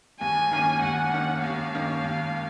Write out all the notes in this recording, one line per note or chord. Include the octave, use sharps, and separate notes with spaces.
D#2 G#5
D#3 A#3 C#4
D#2 F#5
D#3 A#3 C#4
D#2 F5
D#3 A#3 C#4
D#2